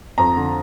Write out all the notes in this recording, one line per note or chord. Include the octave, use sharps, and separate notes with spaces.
F2 A#5
D3